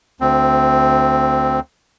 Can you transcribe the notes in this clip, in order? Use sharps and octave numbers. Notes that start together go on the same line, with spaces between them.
D2 C4